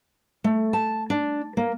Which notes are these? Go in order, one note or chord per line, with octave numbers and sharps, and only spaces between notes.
A3
A5
D4
A#3